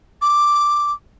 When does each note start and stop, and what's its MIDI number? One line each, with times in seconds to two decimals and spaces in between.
0.22 0.92 86